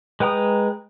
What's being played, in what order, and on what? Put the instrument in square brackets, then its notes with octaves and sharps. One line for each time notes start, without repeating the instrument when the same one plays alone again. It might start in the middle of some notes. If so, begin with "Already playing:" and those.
[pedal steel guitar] G#3 B4 G5 A#5 D#6